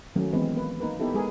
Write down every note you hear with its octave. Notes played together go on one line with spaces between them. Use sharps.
D#3 F#3 A3 A#3 C#4
E3 G#3 B3 C4 D#4 B4
A#3 B4
A#3 D#4 A#4 B4
B3 D#4 E4 G4 A4
G#3 G#4 A#4 B4